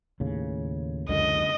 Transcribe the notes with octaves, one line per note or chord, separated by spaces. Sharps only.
D#2 A2 C#3
C#2 F#2 D3 D#5